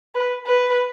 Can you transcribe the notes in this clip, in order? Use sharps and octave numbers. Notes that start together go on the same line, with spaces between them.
B4
B4